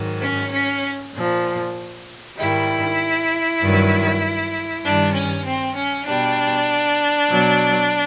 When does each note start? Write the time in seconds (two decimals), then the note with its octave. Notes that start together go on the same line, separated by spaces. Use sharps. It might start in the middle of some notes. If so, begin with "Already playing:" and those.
Already playing: G#2 D#3 F#3
0.23 C#4
0.53 C#4
1.14 A#2 F3
2.38 G#2 D#3 G3 E4
3.61 G2 D#3 F#3
4.84 G2 D#3 G3 D4
5.14 C#4
5.45 C4
5.76 C#4
6.06 B2 G3 D4
7.29 B2 F#3